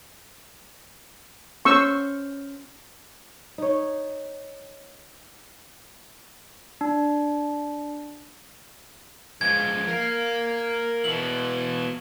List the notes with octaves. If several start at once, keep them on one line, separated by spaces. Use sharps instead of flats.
C#4 C5 C#6 E6
D#4 C#5
D4
F3 G#3 G#6
A#4 F5
B2 E3 F#7